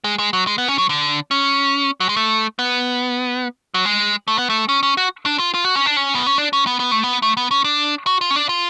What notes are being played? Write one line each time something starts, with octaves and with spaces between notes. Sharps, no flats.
G#3
G#3
F#3
G#3
B3
C#4
F#3
D3
C#4
F#3
G#3
A3
B3
F#3
G#3
A3
B3
A3
C#4
C#4
F#4
D4
F4
F4
F#4
C#4
D4
C#4
B3
C#4
D4
C#4
B3
B3
A3
B3
A3
B3
C#4
D4
F#4
F4
C#4
D4
F4